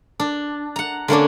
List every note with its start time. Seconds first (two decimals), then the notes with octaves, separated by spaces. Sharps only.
0.20 D4
0.76 F#5 A#5
1.08 D3 A#3 C#4 D4